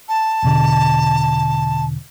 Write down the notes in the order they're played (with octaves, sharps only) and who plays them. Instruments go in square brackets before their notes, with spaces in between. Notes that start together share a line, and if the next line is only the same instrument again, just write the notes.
[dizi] A5
[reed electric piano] E2 B2 D3